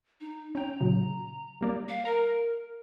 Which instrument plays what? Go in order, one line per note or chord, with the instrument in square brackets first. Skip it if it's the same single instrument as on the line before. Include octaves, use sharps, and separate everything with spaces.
[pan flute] D#4
[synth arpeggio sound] C#4 G5 [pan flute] A#5
[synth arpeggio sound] A#2 C#3 F#3
G3 A#3 D5
[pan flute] F5
[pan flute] A#4 [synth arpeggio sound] A#5